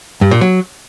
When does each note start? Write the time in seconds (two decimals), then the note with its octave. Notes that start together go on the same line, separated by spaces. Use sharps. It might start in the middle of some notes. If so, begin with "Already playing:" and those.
0.21 G2
0.31 A#2
0.41 F#3